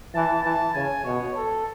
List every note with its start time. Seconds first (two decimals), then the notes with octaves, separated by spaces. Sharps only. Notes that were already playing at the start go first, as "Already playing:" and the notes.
0.14 E3 A5
0.45 E3 A5
0.75 C#3 G#5
1.05 B2 C#5
1.36 A4